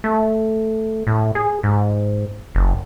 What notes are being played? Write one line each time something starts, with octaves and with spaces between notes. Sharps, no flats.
A3
A2
G#4
G#2
F#1